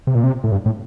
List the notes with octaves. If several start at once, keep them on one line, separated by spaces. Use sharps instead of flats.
C3
A#2
C3
A2
G2
A2